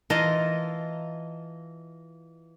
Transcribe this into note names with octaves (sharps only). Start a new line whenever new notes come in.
E3 F4 D#5 A5 A#5 C6